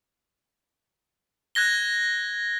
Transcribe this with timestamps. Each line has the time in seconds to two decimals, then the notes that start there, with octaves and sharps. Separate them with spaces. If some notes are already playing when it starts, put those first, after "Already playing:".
1.55 F#6 G#6 A#6 G7